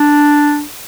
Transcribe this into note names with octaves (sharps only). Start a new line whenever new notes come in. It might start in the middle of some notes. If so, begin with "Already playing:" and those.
Already playing: D4